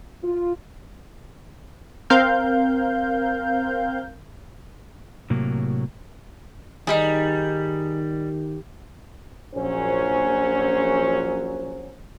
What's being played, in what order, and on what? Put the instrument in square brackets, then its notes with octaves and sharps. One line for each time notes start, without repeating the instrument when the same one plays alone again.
[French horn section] F4
[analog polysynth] C4 A#4 F5 G6
[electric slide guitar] A2 C3 F#3 A#3
[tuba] D#3 [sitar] G3 [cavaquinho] D#4 E4 G#4
[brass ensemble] A#1 F#3 C#4 C5